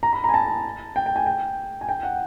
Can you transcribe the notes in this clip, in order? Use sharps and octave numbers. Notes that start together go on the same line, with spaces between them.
A#5
B5
A#5
G#5
A5
G5
G5
G#5
G5
G#5
G5
F#5